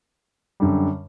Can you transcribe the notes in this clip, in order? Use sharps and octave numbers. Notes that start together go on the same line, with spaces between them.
F#2 D3 G3